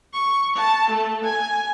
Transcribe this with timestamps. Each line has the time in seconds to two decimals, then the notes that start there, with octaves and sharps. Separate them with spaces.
0.14 C#6
0.56 A5
0.90 A3
1.24 G#5